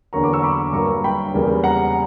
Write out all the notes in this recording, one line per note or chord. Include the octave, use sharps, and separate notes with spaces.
E2 D3 F#3 A#3 A#5 C#6
B5 D6
C#6 E6
B5 D6
G2 F#3 A#3 A#5 C#6
G5 B5
E2 C#3 G3 A#3
F#5 A#5